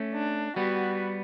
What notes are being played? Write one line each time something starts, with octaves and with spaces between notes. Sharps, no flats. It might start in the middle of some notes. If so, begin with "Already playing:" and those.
Already playing: A3 C#4
D4
G3 B3 F#4